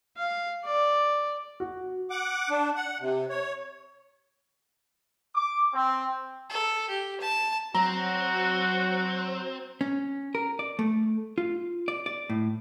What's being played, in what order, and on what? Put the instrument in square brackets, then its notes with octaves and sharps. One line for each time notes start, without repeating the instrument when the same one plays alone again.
[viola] F5
D5
[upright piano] F#4
[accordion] F#5 D6
D4
F#5
C3
C#5
[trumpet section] D6
C4
[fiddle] A4
G4
A5
[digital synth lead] F#3 [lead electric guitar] C4 [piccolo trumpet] F#4 [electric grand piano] A#5
[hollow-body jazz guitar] C#4
A#4
D5
A3
F4
D5
D5
A2